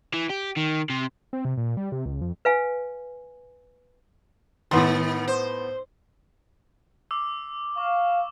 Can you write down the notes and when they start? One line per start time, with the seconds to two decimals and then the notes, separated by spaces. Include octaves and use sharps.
0.14 E3
0.30 G4
0.56 D#3
0.90 C3
1.33 C4
1.45 C3
1.57 A#2
1.77 G3
1.92 C3
2.06 C#2
2.21 F2
2.45 B4 F5 G#5
4.71 A2 D#3 B3 C6
5.28 C5
7.11 D6 E6
7.77 F5 C#6